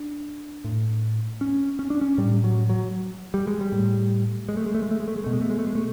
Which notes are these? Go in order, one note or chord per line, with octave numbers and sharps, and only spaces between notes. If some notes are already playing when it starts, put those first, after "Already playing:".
Already playing: D4
A2
C#4
C#4
D4
C#4
A2 G3
F#3
F#3
G3
G#3
G3
A2
G#3
A3
G#3
A3
G#3
A3
G#3
A3
G#3
B2 A3
G#3
A3
G#3
A3
G#3
A3